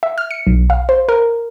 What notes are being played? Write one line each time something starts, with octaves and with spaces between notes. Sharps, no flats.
E5
F6
C#7
B1
F5
C5
A#4